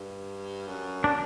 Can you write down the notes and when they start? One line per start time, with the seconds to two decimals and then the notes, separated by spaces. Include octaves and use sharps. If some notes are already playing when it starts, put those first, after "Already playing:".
Already playing: G2
0.67 F#2
1.04 D4